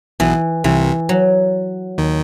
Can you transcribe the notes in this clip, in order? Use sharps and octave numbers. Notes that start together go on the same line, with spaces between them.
B1 B2 E3
C2 C3 E3
F#3
D#2 D#3